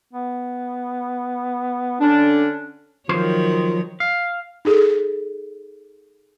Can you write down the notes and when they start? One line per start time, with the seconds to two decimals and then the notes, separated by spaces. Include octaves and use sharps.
0.13 B3
2.01 D3 C#4 D4
3.09 D#3 F3 F#3 C5 C#5
4.00 F5
4.65 D#4 G#4 A4